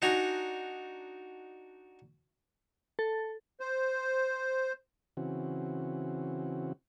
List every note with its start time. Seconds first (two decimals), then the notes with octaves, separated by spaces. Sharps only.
0.02 D4 D#4 F#4 G#5 A#5
2.99 A4
3.60 C5
5.17 C#3 E3 C4 F#4